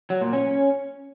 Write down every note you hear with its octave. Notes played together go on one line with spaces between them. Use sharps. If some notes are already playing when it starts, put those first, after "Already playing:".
F#3
A#2
C#4